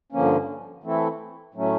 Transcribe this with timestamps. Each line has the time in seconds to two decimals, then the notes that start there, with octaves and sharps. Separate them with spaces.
0.12 G2 D3 F3 A#3 C#4
0.83 E3 A3 C4 E4 A4
1.54 A2 F#3 A3 C#4